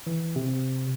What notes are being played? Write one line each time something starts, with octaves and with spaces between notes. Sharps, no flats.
E3
C3